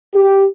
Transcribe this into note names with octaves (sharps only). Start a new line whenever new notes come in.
G4